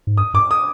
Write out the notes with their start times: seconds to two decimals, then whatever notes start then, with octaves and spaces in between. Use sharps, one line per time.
0.07 G#2
0.17 G2 D#6
0.34 G2 D6
0.51 D#6